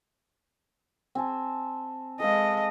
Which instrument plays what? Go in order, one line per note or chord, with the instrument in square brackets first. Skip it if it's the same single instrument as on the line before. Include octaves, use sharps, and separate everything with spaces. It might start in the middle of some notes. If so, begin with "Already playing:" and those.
[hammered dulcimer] C4 G#5 A5
[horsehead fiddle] G#3 D#5 [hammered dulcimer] A4 B4 F5